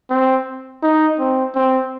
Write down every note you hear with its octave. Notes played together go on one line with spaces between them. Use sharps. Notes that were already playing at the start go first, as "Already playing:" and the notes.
C4
D#4
C4
C4